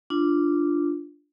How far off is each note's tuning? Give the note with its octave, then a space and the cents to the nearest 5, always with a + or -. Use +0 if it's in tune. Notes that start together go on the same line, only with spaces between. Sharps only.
D4 +0 F4 -15